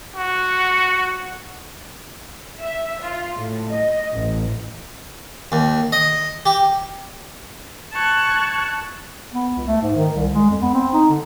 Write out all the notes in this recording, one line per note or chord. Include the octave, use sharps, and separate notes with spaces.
F#4
E5
F4
A2
D#5
A1
D#2
D#5
G4
A5 C#6 F#6 G#6
B3
C#2
A3
G#2
D#3
C2
G#3
F2
B3
C4
D#4
D3